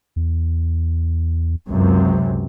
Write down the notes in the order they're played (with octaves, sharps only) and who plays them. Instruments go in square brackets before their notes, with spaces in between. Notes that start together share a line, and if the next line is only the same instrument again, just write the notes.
[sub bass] E2
[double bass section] C#2 F#2 C3